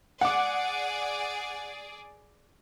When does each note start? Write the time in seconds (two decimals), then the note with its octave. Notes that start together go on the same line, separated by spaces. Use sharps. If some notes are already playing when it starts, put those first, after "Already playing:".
0.21 G#4 D5 F#5 D6